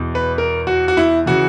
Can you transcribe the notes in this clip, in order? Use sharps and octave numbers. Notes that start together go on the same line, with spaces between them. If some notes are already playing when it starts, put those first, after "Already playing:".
Already playing: E2 B2
B4
A#4
F#4
F#4
E4
C#3 E3 F#4